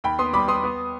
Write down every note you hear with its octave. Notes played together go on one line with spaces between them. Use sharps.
D#2 G5 B5
B3 C6 D#6
G3 B5 D6
B3 C6 D#6
B3